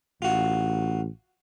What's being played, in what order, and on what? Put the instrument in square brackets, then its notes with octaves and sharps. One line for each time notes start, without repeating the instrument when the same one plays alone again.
[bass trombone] A1 [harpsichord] F4 F#4